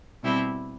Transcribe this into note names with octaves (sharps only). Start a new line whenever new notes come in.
B2 G3 C4 E4 G4